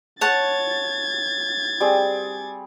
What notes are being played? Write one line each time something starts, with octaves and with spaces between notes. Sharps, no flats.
C#5 F#5 A5 G#6 A6
G3 C4 G#4